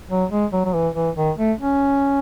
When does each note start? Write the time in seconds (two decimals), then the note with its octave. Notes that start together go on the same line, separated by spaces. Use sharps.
0.10 F#3
0.31 G#3
0.53 F#3
0.65 F#3
0.74 E3
0.95 E3
1.16 D#3
1.38 A3
1.59 C#4